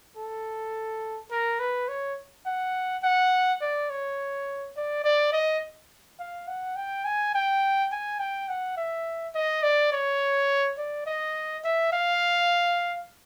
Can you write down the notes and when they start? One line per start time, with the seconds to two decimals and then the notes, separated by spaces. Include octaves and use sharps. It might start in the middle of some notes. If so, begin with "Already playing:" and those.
0.17 A4
1.31 A#4
1.59 B4
1.88 C#5
2.46 F#5
3.03 F#5
3.61 D5
3.90 C#5
4.76 D5
5.04 D5
5.32 D#5
6.19 F5
6.47 F#5
6.76 G5
7.05 G#5
7.34 G5
7.92 G#5
8.19 G5
8.48 F#5
8.77 E5
9.34 D#5
9.63 D5
9.92 C#5
10.78 D5
11.06 D#5
11.64 E5
11.92 F5